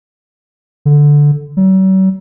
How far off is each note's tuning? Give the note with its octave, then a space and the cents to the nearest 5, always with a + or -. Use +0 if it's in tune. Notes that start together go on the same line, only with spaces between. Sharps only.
D3 -5
F#3 +45